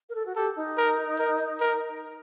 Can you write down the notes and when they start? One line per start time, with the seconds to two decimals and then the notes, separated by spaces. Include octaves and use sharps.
0.09 A#4
0.15 A4
0.26 F#4
0.35 G4 A4
0.56 D#4
0.77 A#4
1.19 A#4
1.60 A#4